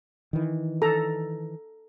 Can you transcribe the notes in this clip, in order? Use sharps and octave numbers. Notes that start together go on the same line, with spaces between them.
D#3 E3
A4 A#5